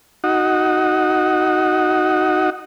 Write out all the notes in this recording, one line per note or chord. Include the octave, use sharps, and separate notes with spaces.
D#4 F#4